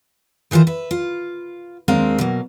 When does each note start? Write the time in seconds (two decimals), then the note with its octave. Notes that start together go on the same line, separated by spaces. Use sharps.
0.51 D#3 E3 F4 A#4 C5
0.67 B4 E5
0.91 F4
1.88 D#2 G#3 C4 D4 A#4 F5
2.18 B2 F#3 A#3